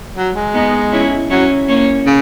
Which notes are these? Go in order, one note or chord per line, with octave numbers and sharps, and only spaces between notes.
F#3
G#3
B3 D#4
C#4 E4
F#3 C#4 E4
A#3 C#4
C#3